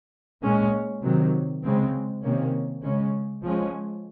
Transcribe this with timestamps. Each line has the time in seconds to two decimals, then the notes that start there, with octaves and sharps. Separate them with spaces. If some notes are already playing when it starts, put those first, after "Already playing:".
0.43 A#2 G#3 C#4
1.02 C3 D#3 F#3
1.63 C#3 G#3 C4
2.23 C3 D#3 A#3 C#4
2.82 C#3 G#3 C#4
3.43 F3 G#3 C#4